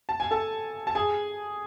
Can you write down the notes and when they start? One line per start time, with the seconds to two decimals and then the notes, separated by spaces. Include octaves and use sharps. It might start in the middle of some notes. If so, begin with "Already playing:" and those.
0.09 A5
0.20 G#5
0.31 A4 A5
0.87 A5
0.95 G#4 G#5